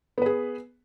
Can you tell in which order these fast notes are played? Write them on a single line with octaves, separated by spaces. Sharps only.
B3 B4 G#4